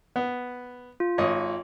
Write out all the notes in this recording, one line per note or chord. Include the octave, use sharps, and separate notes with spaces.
B3
F4
G#1 C#5 D#5